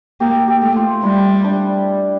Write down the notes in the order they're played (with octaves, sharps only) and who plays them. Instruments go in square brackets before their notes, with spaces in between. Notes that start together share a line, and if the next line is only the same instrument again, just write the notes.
[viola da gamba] A#3 [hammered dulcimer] G4
[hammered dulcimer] G4
[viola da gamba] A3
[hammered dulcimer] F4
[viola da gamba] G3 [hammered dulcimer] E4
[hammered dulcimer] D4